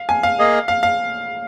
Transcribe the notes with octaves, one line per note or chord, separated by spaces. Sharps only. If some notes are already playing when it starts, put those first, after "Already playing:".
Already playing: F5
G#5
F5
A#3 G#4 D#5
F5
F5